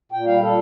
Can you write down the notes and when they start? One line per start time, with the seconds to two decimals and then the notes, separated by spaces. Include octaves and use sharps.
0.12 A#2 G5
0.27 G3 F5
0.41 A#2 A4